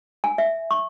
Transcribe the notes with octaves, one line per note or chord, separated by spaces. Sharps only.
G#5
E5
C#6